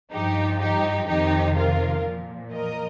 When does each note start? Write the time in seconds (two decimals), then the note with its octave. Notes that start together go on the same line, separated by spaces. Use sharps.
0.12 G2 F3 D#4 G4
0.60 D#4 G4
1.08 F2 C3 D#3 D#4 G4
1.56 F4 A#4
2.04 A#2 F3
2.53 A#4 D#5